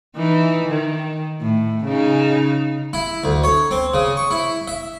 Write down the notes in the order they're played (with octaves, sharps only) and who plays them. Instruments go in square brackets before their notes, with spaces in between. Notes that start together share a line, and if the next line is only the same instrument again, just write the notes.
[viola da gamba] E3 D#4
D#3
A2
C#3 D#4
[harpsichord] E4
D2
C#5
C4
C#3
C#6
E4
E5